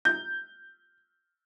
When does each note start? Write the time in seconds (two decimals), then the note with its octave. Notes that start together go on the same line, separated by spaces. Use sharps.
0.05 G6